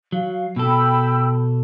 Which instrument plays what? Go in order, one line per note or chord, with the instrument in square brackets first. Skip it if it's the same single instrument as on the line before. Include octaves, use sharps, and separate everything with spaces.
[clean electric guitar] F#3 [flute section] F5
[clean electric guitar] B2 A4 [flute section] G5 B5 E6